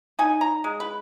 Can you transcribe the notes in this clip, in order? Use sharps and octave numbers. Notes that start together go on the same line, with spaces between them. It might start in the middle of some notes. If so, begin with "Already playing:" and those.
D#4 G#5
A#5
G#3
B4